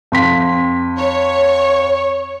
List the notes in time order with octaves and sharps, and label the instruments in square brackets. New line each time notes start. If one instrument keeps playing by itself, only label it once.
[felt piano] F2 C6 B6
[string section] C#5